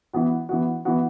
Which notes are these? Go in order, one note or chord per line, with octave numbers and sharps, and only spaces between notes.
E3 B3 F#4
E3 B3 F#4
E3 B3 F#4